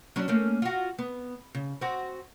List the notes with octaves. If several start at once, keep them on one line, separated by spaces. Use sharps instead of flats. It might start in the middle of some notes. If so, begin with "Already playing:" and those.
F#3 C#4 D4
A3 A#3 C#4
F4 F#4
B3
C#3
C4 F#4